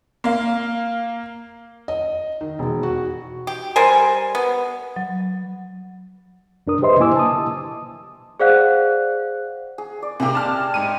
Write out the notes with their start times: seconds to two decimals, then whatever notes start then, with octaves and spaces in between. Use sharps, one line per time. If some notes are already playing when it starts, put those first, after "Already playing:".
0.24 A#3 F5
1.88 D#5
2.41 D#3
2.59 E1
2.83 F#4
3.47 G4
3.76 G3 A#4 C5 G#5
4.35 B3
4.96 F#3
6.67 F#2 D4 A#4 D#6
6.82 G4 B4 C5 D#5 E5 C6
7.00 A#3 E4 G#5 D6 E6
7.16 A5 D#6
8.40 G#4 C5 D5 F5 F#5 F#6
9.78 G#4
10.02 D5
10.20 C3 A#3 G4 E5 G#5
10.35 A5 F6
10.74 G#2 D#7